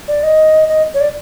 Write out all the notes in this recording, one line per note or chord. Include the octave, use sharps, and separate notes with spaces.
D5
D#5
D#5
C#5
D5